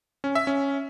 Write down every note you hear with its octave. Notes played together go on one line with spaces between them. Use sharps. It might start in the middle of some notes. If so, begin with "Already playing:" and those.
C#4
E5
C#4